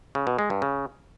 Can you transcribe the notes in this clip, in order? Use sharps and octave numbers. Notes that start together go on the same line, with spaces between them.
C#3
B2
G#3
G2
C#3